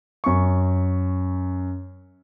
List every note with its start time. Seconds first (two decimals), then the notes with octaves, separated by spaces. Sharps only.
0.24 F#2 C#6